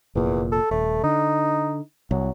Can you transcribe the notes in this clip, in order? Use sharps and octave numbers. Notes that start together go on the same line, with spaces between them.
F1 E2 A#2
A4
D#1 A3
D3 D#4
C2 F#3